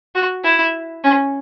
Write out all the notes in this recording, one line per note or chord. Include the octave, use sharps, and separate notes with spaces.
F#4
E4
C#4